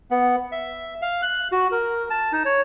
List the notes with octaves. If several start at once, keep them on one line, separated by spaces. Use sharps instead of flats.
B3
E5
F5
F#6
F#4
A#4
A5
D#4
C#5